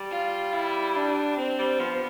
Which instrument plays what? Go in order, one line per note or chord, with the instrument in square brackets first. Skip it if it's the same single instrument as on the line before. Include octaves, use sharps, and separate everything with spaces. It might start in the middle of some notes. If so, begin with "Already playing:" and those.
Already playing: [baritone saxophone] G3
[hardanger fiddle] F4
E4
D4
C4
[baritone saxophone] G3
[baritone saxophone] F3 [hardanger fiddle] B3